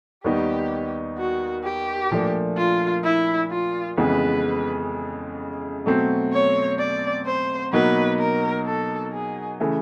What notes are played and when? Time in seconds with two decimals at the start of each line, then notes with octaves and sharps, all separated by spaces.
0.24 D#2 D#3 G3 B3 D#4 G4
1.18 F#4
1.64 G4
2.11 A#2 F3 A3 D4
2.57 F4
3.04 E4
3.51 F4
3.98 F2 C#3 E3 G#3 B3 B4
5.86 B2 F#3 A3 C4
6.33 C#5
6.78 D5
7.26 C5
7.73 B2 F#3 A#3 D#4 B4
8.19 A#4
8.66 A4
9.13 G#4
9.60 C#3 E3 A3